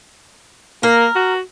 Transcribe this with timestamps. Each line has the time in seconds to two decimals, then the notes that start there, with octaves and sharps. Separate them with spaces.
0.83 A#3 A#4
1.15 F#4